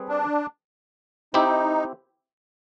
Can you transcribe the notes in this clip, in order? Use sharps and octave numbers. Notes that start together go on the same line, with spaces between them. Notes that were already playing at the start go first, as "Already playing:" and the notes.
Already playing: G3 C4 G#4 B4
D4
C4 D#4 E4 G4